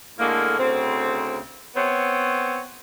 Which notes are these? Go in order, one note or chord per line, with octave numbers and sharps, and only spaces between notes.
A2 D3 G#3 A#3
D2 C#3 C4
B3 C4 C#5